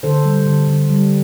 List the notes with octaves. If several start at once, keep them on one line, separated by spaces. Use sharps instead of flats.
D3 A4 C5
G3
D3
D3
G3